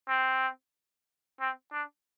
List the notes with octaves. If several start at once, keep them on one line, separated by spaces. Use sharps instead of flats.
C4
C4
D4